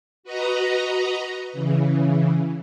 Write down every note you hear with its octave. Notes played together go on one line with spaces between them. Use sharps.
F#4 B4 D#5 A#5
C#3 E3